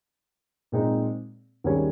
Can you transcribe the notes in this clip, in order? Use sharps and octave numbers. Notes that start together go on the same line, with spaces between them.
A#2 G#3 C4 D#4
D#2 D#3 G3 C#4 G#4